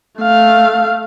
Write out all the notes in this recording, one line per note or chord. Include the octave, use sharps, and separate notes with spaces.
A3 F5